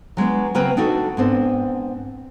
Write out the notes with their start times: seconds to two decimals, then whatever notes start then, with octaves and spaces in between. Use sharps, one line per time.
0.17 F#3 G#3 B3 D4
0.55 C#3 F#3 A#3 C4 B4 G5
0.77 D4 D#4 F#4 A4
1.17 G#2 B3 C4 D4